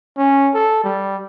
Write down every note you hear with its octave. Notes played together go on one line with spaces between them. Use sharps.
C#4
A4
G3